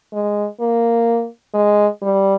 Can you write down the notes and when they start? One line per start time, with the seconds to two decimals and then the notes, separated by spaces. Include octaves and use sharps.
0.13 G#3
0.60 A#3
1.54 G#3
2.02 G3